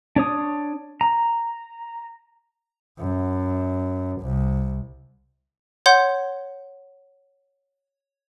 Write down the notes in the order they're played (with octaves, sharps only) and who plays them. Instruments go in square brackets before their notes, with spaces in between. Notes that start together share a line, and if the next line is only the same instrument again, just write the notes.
[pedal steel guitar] D4 C#5 D#6
A#5
[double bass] F#2
C2
[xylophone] C#5 F#5 C6 G6